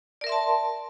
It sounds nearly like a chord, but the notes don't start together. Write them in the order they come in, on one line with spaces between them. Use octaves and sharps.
D5 A#4 E5 C6 A5